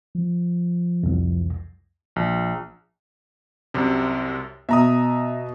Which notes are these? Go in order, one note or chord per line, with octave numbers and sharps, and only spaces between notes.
F3
C2 F2
A#1
C2 F#2 C3
B2 E5 A#5 D#6